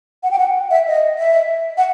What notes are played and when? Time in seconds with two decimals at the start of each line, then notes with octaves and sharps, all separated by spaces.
0.23 F#5
0.31 G5
0.39 F#5
0.70 E5
0.87 D#5
1.18 E5
1.77 F#5